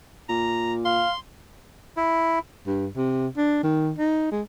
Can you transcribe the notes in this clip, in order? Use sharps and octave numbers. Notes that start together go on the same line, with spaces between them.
A#2 A#5
F5 C6
E4
G2
C3
D4
D#3
D#4
G#3